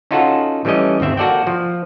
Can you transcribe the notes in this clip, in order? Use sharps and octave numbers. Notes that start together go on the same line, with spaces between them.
C#4 D#4 F4 F#4 A4 F#5
E3 G3 A3 C#4 D#5
G1 D#2 C4 E5
A#3 F#4 A4 D5 F#5 G5
F3